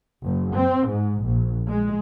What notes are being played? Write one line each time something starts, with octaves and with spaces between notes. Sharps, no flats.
F#1
C4
G#2
A#1
G#3